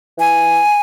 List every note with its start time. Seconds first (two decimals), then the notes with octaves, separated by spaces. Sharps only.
0.18 E3 G#5